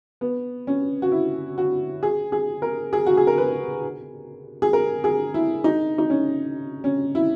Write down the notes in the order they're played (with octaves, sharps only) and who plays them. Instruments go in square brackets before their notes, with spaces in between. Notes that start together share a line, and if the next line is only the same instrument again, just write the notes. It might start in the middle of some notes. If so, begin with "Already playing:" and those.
[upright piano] B3
C#4
F#4
E4
F#4
G#4
G#4
A#4
G#4
F#4
G#4
A#4
B4
G#4
A#4
G#4
E4
D#4
D#4
C#4
C#4
E4